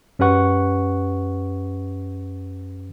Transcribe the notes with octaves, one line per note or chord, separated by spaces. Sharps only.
F#2 C#4 G4 B4 F#5 C#6